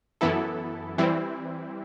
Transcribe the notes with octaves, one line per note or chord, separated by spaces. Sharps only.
F#2 E3 B3 E4 A4
E3 G3 C4 E4